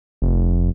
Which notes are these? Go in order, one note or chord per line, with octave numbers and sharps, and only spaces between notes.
F1